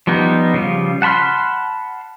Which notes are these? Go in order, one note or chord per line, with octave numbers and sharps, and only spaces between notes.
F3 G3 B3 D#4
C#3 F3 G3
F#5 A5 B5 C6 F6